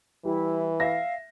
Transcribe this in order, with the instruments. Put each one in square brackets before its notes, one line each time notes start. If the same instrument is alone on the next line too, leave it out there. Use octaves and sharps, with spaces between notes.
[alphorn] E3 [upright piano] G3 [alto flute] E4
[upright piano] E5 A#6 [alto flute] F5